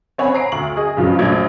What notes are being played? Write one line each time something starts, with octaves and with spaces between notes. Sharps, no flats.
C4 C#5 F#5 G#5 B5
A#5 C7 D7
D2 C#6 F#7
G#4 D#5
G2 C#3 F3 F#3
A#1 F#3 A3 D4 G#6